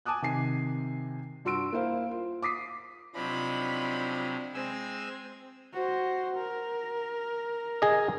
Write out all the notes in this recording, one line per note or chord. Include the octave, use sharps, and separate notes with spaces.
G#5 A5 D6 D#6 F#6
C3 D#3 G#5 C7
G2 F#4 C6 E6 D7
A#3 E4 C5 F5
F4
D6 D#6 B6 C7
C3 F3 F#3 D4 D#4 B5
G#3 C4 G#5 E6
F#4 C5
A#4
G#4 D#5